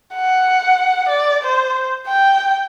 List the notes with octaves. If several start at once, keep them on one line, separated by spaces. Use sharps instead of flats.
F#5
D5
C5
G5